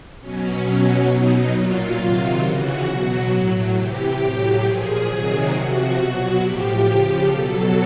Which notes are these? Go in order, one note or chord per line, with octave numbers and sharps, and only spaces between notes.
B2 F#3 C#4
B2 F#3
B2 F#3 D#4
A#2 F#3 F4
C3 D#3 F#3 F4
C#3 E3 F#4
B2 F#3
A2 F#3
C3 E3 G4
A2 F#3
A#2 F3 G#4
C3 D#3 F#3
C3 F3 F#4
B2 F#3
A2 F3 G4
C#3 F3
B2 F#3 A4